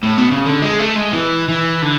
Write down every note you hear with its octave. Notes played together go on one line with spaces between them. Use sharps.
A2
B2
C#3
D3
G#3
A3
G#3
E3
E3
D3